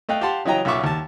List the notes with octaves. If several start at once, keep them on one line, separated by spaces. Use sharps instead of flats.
A3 D#5 F5 G5 F#6
G4 F5 F#5 A5 C6
C#3 E3 F#3 D#5 G5 A#5
B1 C#3 F4 E5 C#6 D6
D#2 A5